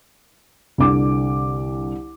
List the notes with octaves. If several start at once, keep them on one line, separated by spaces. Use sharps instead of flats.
C2 D3 D6